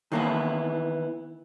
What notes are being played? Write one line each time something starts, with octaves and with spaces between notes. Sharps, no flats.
D#3 E3 A#3 B3 E4